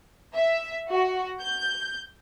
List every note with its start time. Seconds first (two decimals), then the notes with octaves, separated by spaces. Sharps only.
0.35 E5
0.91 F#4
1.40 G6